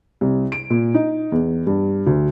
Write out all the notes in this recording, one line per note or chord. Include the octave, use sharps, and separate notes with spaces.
C2
D7
A#2
D#4
E2
G2
D2